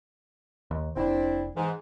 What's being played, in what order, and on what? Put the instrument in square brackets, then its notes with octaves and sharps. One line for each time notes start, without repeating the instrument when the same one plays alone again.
[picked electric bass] D#2
[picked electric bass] F1 [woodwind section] C4 D4 E4
[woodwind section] G#2 E3